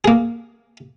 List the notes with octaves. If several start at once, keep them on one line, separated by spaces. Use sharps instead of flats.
A#3 G#4